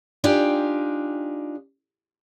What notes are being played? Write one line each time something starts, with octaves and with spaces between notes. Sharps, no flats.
D4 D#4 F4 G4 G5 G#5